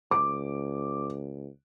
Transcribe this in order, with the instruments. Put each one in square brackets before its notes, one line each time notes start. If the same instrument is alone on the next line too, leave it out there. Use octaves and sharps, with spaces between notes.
[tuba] C#2 [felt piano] D6